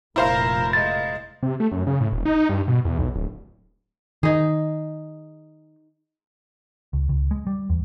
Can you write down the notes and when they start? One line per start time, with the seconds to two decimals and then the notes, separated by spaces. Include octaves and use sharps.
0.16 F1 A#2 E4 A#4 C5 F5
0.73 G#3 A6
1.43 C3
1.60 A3
1.72 F#2
1.87 C#3
2.01 A2
2.12 E1
2.25 D#4
2.49 G2
2.68 B2
2.85 E2
2.98 B1
3.15 D1
4.23 D#3 D#4 G#4
6.93 C#2
7.09 C#2
7.31 G#3
7.47 G3
7.70 E2